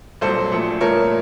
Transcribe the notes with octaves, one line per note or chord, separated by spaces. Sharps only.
C2 A#2 F#3 A4 C5
A#1 A#2 F3 A3
C2 A#2 F3 A3 A#4 C#5